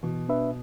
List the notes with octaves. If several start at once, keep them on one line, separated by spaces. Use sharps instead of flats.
B2 E3
B3 D4 B4 E5